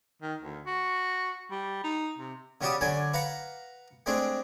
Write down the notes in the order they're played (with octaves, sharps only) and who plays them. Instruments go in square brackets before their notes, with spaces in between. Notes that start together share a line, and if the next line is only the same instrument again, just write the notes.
[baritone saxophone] D#3
D2
F#4
G3
D#4
C3
[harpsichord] C#3 G3 F#4 G4 A5 D#6
D3 F#3 D5 G#5
B4 F5 F#5 A#5
G#3 A3 C4 D4 G#4